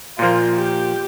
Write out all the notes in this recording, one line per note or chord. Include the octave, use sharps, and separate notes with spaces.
A#2 F3 A#3 F4
G4